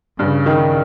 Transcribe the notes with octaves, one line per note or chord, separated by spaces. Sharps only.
G2 C#3
D#3